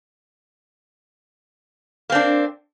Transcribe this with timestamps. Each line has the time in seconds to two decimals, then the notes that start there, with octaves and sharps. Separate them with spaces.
2.10 A#3
2.12 C4
2.15 D4